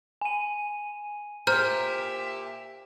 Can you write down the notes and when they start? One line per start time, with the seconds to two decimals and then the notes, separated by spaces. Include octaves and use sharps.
0.21 G#5 D#7
1.47 A#2 G4 C5 E5 A#5 F6 G6